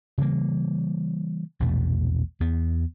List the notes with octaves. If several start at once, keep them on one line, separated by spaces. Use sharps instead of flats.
C#3 E3 G3 A#3
A#1 E2 B2 A3
E2 B3